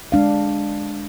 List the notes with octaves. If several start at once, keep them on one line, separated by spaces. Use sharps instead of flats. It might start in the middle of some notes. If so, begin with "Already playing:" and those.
G#3 D4 F5